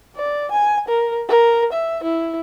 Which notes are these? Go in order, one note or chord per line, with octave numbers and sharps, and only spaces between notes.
D5
G#5
A#4
A#4
E5
E4